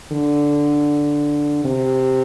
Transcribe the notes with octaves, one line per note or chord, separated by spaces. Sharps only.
D3
C3